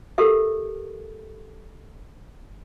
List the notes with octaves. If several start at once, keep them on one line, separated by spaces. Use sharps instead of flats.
G4 A4 A#4 E5